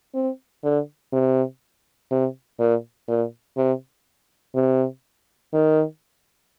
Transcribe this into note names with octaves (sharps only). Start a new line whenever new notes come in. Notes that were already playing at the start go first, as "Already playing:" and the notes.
C4
D3
C3
C3
A#2
A#2
C3
C3
D#3